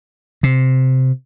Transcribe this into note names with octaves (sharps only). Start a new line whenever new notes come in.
C3